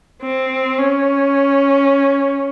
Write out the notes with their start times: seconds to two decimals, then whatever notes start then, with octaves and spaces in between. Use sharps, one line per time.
0.22 C4
0.78 C#4